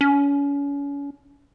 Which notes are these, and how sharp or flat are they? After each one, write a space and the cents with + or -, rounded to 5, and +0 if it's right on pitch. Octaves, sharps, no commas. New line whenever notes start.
C#4 +35